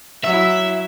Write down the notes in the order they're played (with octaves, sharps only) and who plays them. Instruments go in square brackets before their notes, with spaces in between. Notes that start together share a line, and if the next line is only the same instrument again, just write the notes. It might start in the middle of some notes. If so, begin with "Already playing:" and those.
[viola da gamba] F#3 E4 [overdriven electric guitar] E5